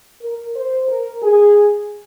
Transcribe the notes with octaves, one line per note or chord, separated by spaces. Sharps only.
A#4
C5
A#4
G#4